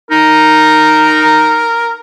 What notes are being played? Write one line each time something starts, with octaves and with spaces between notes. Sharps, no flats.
D#4 A#4